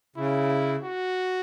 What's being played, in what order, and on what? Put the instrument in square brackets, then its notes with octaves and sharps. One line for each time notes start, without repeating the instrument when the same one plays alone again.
[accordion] C#3 [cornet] E4
[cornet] F#4